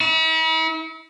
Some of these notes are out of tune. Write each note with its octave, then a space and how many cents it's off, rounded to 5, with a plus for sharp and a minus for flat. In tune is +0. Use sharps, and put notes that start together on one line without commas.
E4 -45